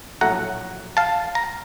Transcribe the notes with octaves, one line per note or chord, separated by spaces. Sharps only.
A#1 A2 F#3 A3 F#5 A#5
F5 A5
A#5